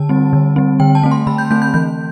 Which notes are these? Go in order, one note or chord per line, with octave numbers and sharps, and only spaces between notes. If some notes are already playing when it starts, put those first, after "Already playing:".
Already playing: D3 A5
G3 C4
D3
G3 C4
D3 G5
A5
A3 C4
C6
D3 B5
G6
A3 C4 G6
G6
E3 G6